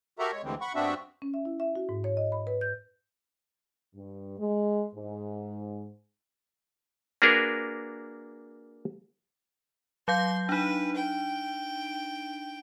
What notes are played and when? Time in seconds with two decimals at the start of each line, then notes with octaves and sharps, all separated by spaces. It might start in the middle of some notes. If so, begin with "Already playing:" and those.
0.19 F#4 G4 A4 A#4 E5 A#5
0.32 G#3 C#5
0.43 D2 D3 E3 G3 G#3 C4
0.61 F#5 B5 C#6
0.75 G2 B3 C4 D4 F#4 E5
1.22 C#4
1.34 E5
1.45 E4
1.60 E5
1.76 F#4
1.89 G#2
2.04 C#5
2.17 D#5
2.32 B5
2.47 B4
2.61 G6
3.95 G2
4.39 G#3
4.95 G#2
7.22 A#3 D4 F#4 G#4 A#4 B4
10.08 F#3 F5 C6 G6
10.49 D4 D#4 B4
10.95 G5